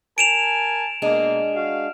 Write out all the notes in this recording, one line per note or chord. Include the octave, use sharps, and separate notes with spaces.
A#4 G#5 A5 D7 E7 F7
B2 G#3 A#3 D4 G#4
F#4 F5